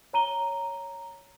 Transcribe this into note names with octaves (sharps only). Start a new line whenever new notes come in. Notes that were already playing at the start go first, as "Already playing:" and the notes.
C#5 A#5 D#7 G7